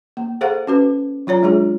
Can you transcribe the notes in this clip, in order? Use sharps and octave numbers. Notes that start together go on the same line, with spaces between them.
A#3
G#4 A4 C5 F5 F#5
C#4 F#4 B4
F#3 F4 C#5 A#5
G#3 D4 F4 G#4